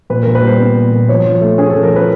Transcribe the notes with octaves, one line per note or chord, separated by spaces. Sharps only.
A#2 B4
A#2 A#4
B4
G3 C5
B3
A#2
A#2
F3 C#5
F3
A3
C#4 G#4
F3 A4
A#4
F3 B4